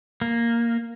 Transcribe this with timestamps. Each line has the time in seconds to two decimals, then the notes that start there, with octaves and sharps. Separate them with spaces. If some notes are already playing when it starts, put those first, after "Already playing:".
0.22 A#3